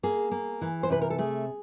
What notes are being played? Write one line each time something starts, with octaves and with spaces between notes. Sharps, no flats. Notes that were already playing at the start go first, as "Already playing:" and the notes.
A#3 G#4
A#3
E3
C5
C3 B4
A#4
A4
A3 G#4